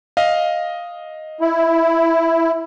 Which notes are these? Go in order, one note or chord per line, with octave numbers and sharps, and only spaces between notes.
D#5 F5
E4